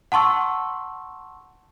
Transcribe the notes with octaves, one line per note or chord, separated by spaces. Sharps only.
F#5 A5 C6 C#6 E6